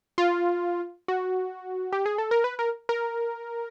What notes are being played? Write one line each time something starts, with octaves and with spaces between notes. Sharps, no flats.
F4
F#4
G4
G#4
A4
A#4
B4
A#4
A#4